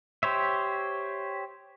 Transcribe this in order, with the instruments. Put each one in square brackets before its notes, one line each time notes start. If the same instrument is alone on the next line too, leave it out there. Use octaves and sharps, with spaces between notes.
[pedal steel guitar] G4 C5 C#5 E5